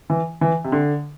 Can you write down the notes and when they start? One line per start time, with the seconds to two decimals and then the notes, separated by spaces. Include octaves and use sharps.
0.10 E3
0.41 E3
0.64 C3
0.72 D3